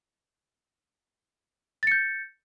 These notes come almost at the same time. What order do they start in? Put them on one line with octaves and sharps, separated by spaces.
A6 C#7 G6